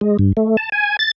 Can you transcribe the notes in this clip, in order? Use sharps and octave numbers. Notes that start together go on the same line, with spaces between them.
G#3
G2
A3
A5
G#5
A6